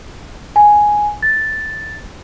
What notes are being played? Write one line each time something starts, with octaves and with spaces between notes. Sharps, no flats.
G#5
A6